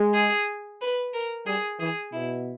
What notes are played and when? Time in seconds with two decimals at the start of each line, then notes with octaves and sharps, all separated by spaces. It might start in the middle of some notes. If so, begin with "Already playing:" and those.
Already playing: G#3
0.14 G#4
0.81 B4
1.13 A#4
1.47 G3 G#4
1.80 E3 G#4
2.13 B2 E4